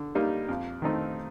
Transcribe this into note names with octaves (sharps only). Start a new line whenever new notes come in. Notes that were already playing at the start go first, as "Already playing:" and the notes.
Already playing: D3
G3 A#3 D#4
F2
D#3 A3 C4 D#4